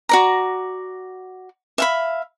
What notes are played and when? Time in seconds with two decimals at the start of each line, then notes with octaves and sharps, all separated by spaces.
0.09 F#4 D5 A#5
1.78 E5 F5 B5